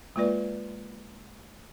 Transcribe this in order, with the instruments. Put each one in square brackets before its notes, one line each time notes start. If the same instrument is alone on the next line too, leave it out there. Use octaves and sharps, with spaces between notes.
[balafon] G#3 A#3 F4 B4 D5